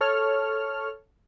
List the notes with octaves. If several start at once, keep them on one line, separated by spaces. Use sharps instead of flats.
A4 C#5 F6